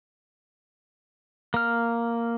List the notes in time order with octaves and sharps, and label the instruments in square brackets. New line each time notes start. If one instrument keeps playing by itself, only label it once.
[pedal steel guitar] A#3 F6